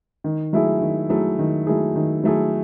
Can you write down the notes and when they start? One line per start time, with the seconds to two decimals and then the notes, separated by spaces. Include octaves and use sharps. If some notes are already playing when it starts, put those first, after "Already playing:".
0.24 D#3
0.53 F#3 A3 E4 G#4
0.81 D#3
1.09 F#3 A3 E4 G#4
1.39 D#3
1.67 F#3 A3 E4 G#4
1.96 D#3
2.24 F#3 A3 E4 G#4